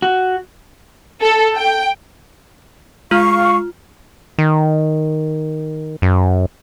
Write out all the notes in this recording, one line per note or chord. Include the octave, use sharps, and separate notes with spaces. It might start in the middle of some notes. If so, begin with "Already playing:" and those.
F#4
A4
G5
G#3 F4 F5 C#6 F6
D#3
F#2